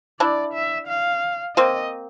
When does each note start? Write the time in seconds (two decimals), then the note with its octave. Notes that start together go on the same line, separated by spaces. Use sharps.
0.20 D4 E4 D5
0.54 E5
0.88 F5
1.56 A#3 C4 D#5